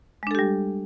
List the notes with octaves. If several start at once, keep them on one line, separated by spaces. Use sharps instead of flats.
G3 G#3 D4 G4 A4